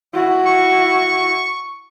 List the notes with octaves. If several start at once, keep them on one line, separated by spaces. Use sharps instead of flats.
E4 F#4
C#6